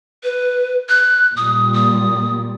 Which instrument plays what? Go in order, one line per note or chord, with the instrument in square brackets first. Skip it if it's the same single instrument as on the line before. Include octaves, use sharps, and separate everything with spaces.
[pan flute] B4
F#6
[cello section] A#2 G3 [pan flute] D#6
[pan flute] D#6